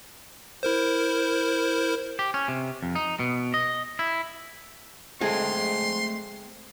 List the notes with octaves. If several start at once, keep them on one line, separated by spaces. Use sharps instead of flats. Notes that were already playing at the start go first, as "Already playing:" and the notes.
E4 A#4 C5
G4
C#4
C3
F2
D#4
B2
D#5
E4
G#3 A3 C4 G#4 A4 D#5 F5 C6